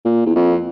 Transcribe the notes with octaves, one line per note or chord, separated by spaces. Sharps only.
A#2
E2
F2